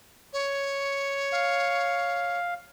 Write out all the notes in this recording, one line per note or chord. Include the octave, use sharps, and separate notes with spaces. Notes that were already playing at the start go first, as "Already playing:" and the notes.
C#5
F5